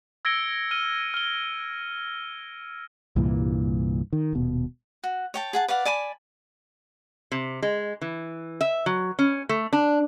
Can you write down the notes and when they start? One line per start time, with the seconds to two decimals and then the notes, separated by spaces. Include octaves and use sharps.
0.25 E6 G#6 A#6 C#7 D7 G7
0.71 F6 D#7 G7
1.14 F6 G7
3.16 C2 G2 A#2 E3
4.13 D#3
4.33 D#1 B2
5.04 F#4
5.34 C#5 G5 A5
5.53 G#4 F#5 A5
5.68 B4 D5 F5 F#5
5.85 D5 G#5 A5 B5
7.32 C3
7.63 G#3
8.02 E3
8.61 E5
8.86 F#3
9.19 C#4
9.49 A3
9.73 D4